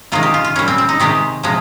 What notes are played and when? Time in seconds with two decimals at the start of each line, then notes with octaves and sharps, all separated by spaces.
0.12 C3 D#3 G#3 F4
0.23 G4
0.34 F4
0.45 F4
0.56 A#2 G3 C#4
0.68 C4
0.78 C4
0.89 D#4
1.00 C3 D#3 G#3 G4
1.43 C3 F3 G#3